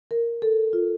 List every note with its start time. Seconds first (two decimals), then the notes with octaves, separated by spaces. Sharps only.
0.11 A#4
0.42 A4
0.73 F4